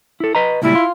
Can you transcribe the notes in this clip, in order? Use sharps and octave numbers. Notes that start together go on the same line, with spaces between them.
E4 A4
B4 D#5 A#5
C#2 A#2 G3 E4
F4